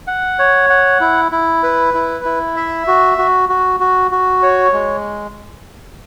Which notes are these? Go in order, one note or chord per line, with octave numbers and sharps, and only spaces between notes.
F#5
C#5
F#5
E4
E4
B4
E4
E4
E5
F#4
F#4
F#4
F#4
F#4
C#5
G#3